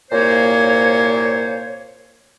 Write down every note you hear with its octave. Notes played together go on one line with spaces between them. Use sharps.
C2 A#2 A#3 C5 C#5